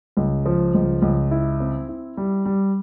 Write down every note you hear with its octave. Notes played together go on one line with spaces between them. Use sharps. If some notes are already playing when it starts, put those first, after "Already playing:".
C#2
F3
C#2
C#2
E4
C4
E4
G3
G3